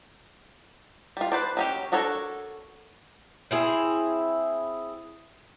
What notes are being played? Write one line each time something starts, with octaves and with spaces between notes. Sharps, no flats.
G3 F4
B4 C5 D5
F#3 C#4 G4
D4 F#4 A4 A#4 C#5
C4 E4 G#4